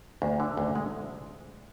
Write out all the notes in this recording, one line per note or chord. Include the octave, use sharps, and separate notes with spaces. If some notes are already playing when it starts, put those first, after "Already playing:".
D2
D3
D2
G#3